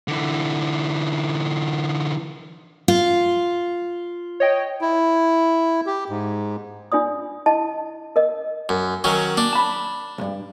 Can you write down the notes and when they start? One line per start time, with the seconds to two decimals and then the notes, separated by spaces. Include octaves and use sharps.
0.08 D3 E3
2.88 F4
4.40 C#5 D#5 G5
4.81 E4
5.86 G4
6.10 G#2
6.92 D4 F4 D5 D#6
7.46 E4 D#5 A5
8.16 A#4 D#5
8.69 F#2
9.04 D#3 F#3 C#4
9.37 A#3 D4
9.53 A5 B5
10.18 B1 G2